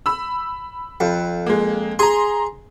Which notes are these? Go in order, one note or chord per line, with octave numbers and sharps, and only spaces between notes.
B5 E6
F2
G#3 A#3
G#4 A#5 C6